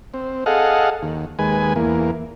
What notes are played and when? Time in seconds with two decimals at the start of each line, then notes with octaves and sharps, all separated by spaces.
0.14 C4
0.46 G#4 A4 D#5 F5 F#5
1.02 D#2
1.39 D#2 G#3 B4 G#5
1.76 E2 A#3